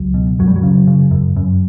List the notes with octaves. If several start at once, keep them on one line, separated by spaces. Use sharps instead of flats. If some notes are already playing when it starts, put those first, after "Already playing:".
Already playing: C#2 F#3
B2
F#2 F#3
G3
F#3
C#3
C#3
F#2
F#2